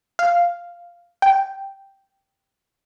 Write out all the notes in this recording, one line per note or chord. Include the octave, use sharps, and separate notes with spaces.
F5
G5